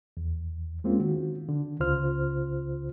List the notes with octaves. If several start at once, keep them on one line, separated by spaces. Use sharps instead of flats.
E2
G#3 A#3 C4 C#4 F4
D#3 F#4
D3
C#2 C#3 F4 C5 F6